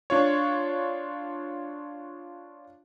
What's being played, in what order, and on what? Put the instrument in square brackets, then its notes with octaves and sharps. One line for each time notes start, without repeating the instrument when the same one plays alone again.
[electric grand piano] D4 F4 C#5